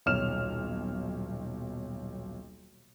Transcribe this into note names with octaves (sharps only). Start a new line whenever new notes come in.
D#1 B1 C#5 F6 E7